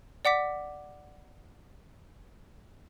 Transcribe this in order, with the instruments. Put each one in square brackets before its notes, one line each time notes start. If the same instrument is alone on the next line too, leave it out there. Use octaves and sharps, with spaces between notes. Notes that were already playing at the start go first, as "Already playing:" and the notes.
[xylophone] D5 F#5 D6 B6